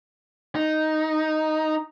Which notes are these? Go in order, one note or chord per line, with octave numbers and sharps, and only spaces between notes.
D#4